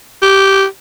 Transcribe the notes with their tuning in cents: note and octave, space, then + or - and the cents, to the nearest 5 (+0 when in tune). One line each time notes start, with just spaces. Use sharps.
G4 -10